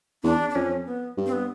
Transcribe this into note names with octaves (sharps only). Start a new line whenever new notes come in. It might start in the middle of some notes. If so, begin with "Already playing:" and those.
E2 D4
D4
F2 C#4
B3
G2
C4
B3